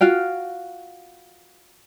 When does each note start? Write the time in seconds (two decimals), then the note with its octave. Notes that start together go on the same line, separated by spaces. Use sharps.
0.01 F4 F#4 F5 G5